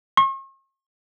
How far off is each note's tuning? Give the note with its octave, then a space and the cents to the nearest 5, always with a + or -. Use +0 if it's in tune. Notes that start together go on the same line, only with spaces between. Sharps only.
C#6 -45